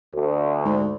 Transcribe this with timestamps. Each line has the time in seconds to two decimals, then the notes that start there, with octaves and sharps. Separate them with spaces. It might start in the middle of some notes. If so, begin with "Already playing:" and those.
0.14 D2
0.65 G#2